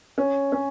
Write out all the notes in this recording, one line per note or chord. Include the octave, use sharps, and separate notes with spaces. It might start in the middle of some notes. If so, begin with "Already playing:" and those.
C#4
C#4